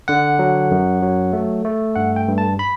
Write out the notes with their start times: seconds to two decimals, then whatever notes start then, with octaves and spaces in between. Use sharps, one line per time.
0.08 D3 F#5
0.39 F#3
0.71 F#2
1.02 F#3
1.33 A3
1.65 A3
1.96 G2 F#5
2.16 G5
2.28 G2
2.38 A5
2.59 B5